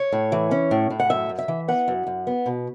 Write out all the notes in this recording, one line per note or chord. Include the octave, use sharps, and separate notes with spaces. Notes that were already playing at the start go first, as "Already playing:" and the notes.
Already playing: C#5
A2
E3
C#4
A2
A2
F#5
F#2 E5
F#2
E5
E3
B3 F#5
F#2
F#2
B3
B2